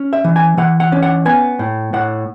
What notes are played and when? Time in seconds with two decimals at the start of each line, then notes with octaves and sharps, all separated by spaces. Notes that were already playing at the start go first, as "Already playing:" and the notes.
Already playing: C#4
0.13 E5
0.24 E3
0.36 G#5
0.57 E3 F#5
0.80 F#5
0.92 C#4
1.02 F#5
1.25 B3 G#5
1.59 A2
1.94 A2 F#5